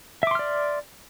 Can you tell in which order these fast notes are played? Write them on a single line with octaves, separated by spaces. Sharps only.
E5 D6 C6 F6 D5